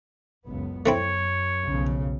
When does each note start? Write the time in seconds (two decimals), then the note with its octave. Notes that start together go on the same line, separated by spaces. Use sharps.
0.45 F#1 C#2 B3
0.86 F#2 A3 C4 E4 C#5
1.63 B1 F2 C#3